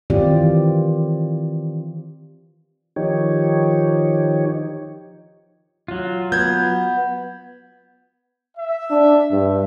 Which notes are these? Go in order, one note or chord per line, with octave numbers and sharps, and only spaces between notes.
D#3 E3 C4 F4 G4 D5
D#3 F3 D#4 G4 C#5
F#3 F4
B3 G6 G#6
E5
D4
G2